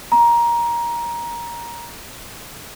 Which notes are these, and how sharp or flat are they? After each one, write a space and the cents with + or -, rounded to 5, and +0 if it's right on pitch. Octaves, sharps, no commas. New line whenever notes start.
A#5 +15